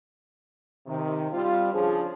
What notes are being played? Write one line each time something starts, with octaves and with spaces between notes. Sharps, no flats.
C3 D#3
G3 C4 F4
C#3 F3 C#4 D4 G#4